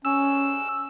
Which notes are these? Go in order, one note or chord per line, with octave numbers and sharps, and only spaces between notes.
C#4 E6